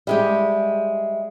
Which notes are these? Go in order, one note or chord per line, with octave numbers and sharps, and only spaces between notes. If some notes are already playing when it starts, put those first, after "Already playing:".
G3 G#3 G4 D#5 E5